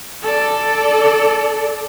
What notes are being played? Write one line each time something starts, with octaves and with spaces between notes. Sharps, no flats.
A4 D5